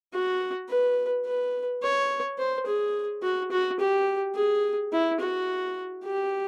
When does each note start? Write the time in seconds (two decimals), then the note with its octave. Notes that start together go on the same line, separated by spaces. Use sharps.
0.13 F#4
0.69 B4
1.26 B4
1.83 C#5
2.38 C5
2.66 G#4
3.23 F#4
3.51 F#4
3.80 G4
4.35 G#4
4.92 E4
5.20 F#4
6.04 G4